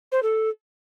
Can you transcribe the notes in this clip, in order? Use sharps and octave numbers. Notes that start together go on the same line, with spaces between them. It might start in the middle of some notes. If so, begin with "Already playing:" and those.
C5
A4